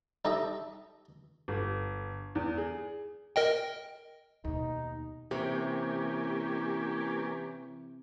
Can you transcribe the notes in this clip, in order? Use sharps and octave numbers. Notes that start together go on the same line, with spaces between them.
D#4 G4 A4 D#5 E5
G1
E2
G#4
A#4 D#5 G5
D#2 B2 D#4
C3 E3 A#3 C#4 G4 G#5